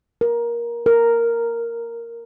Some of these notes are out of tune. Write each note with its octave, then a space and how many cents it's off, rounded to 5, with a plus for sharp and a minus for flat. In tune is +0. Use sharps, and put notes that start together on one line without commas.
A#4 +15
A#4 -5